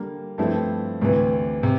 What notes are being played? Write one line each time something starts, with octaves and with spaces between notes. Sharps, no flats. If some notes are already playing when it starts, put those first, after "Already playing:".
Already playing: D3 G3 A#3
G2 F3 A3 C4 E4
D2 C3 E3
C3